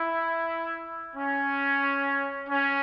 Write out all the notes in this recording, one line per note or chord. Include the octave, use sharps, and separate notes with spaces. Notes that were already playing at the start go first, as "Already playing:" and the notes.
Already playing: E4
C#4
C#4